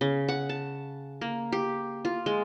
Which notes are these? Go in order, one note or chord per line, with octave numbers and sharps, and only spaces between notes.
C#3
F#5
A5
A#3
G4
F4
G#3